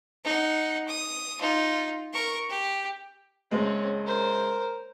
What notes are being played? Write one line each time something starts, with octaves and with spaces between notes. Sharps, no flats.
D#4 F#5
D#6
D#4 F4
A#4 C#6
G4
F#1 G#3 C4 C#5
A#4 C5